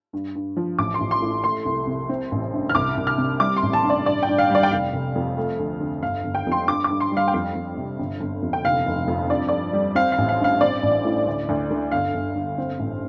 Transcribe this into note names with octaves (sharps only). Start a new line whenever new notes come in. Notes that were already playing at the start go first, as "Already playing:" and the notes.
G2
G2
F3
A1 D6
C6
A1
C6
A2
A3 C6
C2
C3
C4
A1
G2
F6
C2 D6
C2
F6
C3
G3 D6
C6
A1
A5
G2
D5
G2 D5
G5
G2
F5
G3 D5
G5
F1 F5
F1
F2
A3
D2
D3
G1 F5
G1
G5
F2 C6
G2 D6
G2 D6
C6
G3
F5
G5
F2 F5
F2
C3
G1
G1
F2
G5
F1 F5
F1
F2
G2 D5
G2 D5
G3
C4 F5
F5
A1
F5
G2 F5
C4 D5
A1
A2
D2
D2
D3
G1 F5
G1
G2
C4
A1